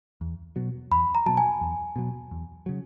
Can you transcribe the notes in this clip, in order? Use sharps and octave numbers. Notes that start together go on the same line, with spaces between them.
E2
B2 F#3
E2 B5
A#5
B2 F#3 A5
G#5
E2
B2 F#3
E2
C#3 F#3